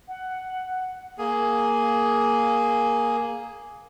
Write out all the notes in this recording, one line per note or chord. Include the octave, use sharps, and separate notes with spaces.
F#5
A#3 G#4